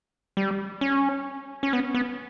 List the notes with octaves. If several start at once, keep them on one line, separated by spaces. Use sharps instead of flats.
G3
C#4
C#4
B3
B3